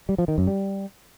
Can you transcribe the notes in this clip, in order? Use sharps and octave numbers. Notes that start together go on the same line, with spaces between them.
G3
F3
D#3
F#2
G3